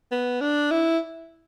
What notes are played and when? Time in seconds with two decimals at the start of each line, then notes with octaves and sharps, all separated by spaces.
0.11 B3
0.41 D4
0.71 E4